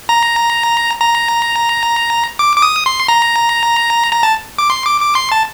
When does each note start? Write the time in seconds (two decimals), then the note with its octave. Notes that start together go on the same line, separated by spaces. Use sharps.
0.09 A#5
1.01 A#5
2.39 D6
2.57 D6
2.62 D#6
2.86 C6
3.08 A#5
4.12 A#5
4.23 A5
4.58 D6
4.70 C6
4.85 D6
5.00 D6
5.15 C6
5.32 A5